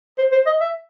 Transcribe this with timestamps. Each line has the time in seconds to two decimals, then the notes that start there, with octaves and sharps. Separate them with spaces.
0.18 C5
0.32 C5
0.46 D#5
0.61 E5